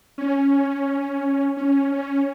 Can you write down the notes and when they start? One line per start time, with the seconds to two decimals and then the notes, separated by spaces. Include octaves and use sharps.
0.18 C#4
1.57 C#4
1.92 C#4